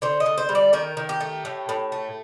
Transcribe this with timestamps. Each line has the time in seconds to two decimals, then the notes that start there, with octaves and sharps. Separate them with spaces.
0.02 D3 C5
0.20 D#5
0.26 D3
0.38 C5
0.49 G3
0.55 D5
0.73 D#3 A#4
0.97 D#3
1.09 G4
1.21 A3
1.45 A2
1.69 A2
1.92 A3